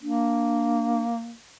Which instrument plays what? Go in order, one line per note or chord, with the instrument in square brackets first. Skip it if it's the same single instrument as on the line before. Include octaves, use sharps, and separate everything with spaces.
[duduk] A#3 [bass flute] D4